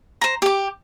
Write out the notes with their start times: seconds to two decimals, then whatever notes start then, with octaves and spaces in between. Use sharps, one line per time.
0.21 C5 A#5
0.42 G4 D6